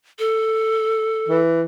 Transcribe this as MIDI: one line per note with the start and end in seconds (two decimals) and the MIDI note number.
0.19 1.41 69
1.28 1.63 52